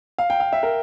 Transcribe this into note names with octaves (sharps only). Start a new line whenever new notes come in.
F5
G5
F5
E5
A#4